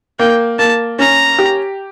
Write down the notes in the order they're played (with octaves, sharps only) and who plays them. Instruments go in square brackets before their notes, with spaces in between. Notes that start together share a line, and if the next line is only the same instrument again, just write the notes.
[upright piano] A#3 [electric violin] G5
[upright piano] A#3 [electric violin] A5
[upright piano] C#4 [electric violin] A#5
[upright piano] G4